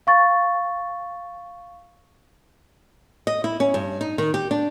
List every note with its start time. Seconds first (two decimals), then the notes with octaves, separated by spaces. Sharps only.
0.07 F5 C#6 A6
3.27 D#5
3.44 E4
3.60 C#4
3.74 G2
4.01 D#4
4.18 D#3
4.34 G4
4.51 D4